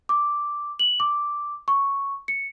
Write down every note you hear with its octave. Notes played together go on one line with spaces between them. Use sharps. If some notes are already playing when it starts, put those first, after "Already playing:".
D6
F#7
D6
C#6
C#7